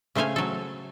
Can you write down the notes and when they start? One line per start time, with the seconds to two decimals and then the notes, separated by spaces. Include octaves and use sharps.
0.15 C#3 A3 C5 F5 G#5
0.36 F#3 A4